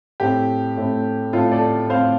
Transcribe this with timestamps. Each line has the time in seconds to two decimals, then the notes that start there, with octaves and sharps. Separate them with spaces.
0.20 A2 A3 C4 G4
0.77 A2 A3 C4
1.33 A2 A3 C4 F4 A4
1.52 A4 D5
1.90 A2 A3 C4 C5 F5